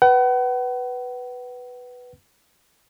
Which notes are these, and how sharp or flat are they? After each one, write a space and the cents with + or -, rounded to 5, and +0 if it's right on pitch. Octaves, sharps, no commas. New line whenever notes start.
B4 +0 F#5 +40